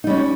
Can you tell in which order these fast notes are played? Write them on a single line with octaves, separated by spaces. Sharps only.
D#4 G3 C#4